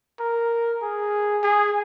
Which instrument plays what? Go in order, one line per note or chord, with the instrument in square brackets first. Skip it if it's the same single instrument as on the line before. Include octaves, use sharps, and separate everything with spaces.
[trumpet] A#4
G#4
G#4